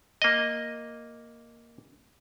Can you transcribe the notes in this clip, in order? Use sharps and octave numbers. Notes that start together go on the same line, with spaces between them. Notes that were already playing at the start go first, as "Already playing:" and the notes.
A#3 D#5